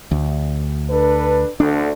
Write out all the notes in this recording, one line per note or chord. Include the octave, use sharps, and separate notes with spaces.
D2
D4 A4 B4
D2 D3 D4